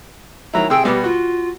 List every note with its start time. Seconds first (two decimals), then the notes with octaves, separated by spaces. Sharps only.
0.54 D#3 F#3 E4 A#5
0.70 C3 G#4 G5 E6
0.85 B2 G3 B3 G4
1.04 F4 F#4